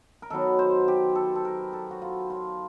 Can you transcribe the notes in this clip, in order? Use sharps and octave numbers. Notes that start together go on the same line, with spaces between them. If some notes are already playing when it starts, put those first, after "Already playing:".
A#4
D#3 F#3 B3 A4
C5
G4
A4
A4
A#4
A4
F#4
F4
F4